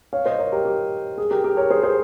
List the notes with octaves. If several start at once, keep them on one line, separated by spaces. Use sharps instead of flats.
C#5 F5
C5 D#5
A#4 C#5
G4 A#4
G4
G#4
G4 A#4
G4 A#4
A#4 C#5
G#4 C5
G#4 C5